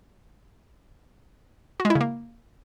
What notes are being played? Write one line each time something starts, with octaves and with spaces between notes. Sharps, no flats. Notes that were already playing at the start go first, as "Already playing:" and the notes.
F#4
G#3
E4
C#3
A#3